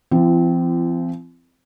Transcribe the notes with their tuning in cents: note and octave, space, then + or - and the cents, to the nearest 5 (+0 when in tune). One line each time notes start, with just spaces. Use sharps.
F3 -45 C4 -20 E4 +45